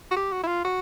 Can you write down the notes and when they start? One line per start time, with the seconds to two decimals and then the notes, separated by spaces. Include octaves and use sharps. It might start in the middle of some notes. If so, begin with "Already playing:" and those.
0.11 F#4
0.16 G4
0.32 F#4
0.43 E4
0.47 F4
0.65 F#4